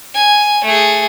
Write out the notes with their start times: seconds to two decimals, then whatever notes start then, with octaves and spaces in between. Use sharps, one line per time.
0.14 G#5
0.64 A3 G#4